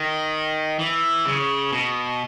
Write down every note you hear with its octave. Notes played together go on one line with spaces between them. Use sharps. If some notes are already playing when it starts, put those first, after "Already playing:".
Already playing: D#3
E3
C#3
B2